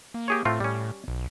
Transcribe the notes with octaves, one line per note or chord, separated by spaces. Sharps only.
A#3
G4 G#4 C#5
A2 A3 C4 F4
A2 G3 C#4
B1